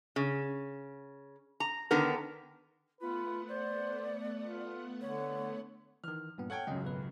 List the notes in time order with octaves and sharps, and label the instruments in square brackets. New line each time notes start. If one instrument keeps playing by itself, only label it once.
[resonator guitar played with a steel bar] C#3
A#5
D3 D#3 B3 A#4
[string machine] A3 B3 F#5 [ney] F4 [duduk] B4
[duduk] C5 [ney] D5
[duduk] F4
[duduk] D3 [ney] C#5
[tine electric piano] D#3 E3 [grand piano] F6
[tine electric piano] G2 A#2 B3
[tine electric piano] A4 C#5 G#6 [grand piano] F#5 G5
[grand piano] C#2 F#2 [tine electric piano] C#4 D#5
[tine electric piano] G#1 B2 B4